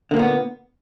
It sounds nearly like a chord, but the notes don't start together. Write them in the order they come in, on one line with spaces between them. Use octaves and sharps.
D3 A#3 A#2 B3